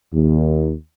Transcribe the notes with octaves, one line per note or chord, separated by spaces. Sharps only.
D#2